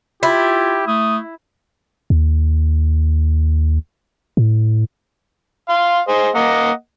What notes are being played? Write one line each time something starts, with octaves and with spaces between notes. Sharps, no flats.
E4 F4 G4
A3 D#6
D#2
A2
F5 C6
G#4 C5 D#5
A#3 D#5 F#5